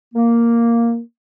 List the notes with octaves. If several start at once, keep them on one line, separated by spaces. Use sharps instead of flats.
A#3